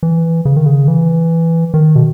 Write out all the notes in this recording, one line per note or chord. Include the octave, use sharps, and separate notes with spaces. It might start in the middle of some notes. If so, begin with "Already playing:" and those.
E3
C#3
D#3
C#3
E3
D#3
B2